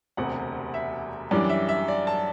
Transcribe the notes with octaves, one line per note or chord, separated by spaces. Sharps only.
E1 D2 C3 F#5
E5
F#2 E3 G3 D4 D5
E5
E5
D5
A5